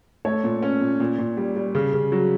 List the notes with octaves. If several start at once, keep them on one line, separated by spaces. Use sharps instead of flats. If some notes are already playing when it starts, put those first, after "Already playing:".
A3 C#5
A#2
C#4
A#2
A#2
A#2
G3
G3
C#3
C#3
F#3